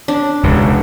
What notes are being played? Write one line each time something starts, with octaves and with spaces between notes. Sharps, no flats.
D4
E1 C#2 C#3